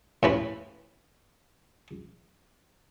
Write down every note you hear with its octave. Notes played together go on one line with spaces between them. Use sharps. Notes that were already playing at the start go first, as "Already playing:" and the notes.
A2 C#4 B4